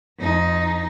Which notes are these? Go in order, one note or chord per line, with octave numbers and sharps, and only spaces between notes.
F2 D#4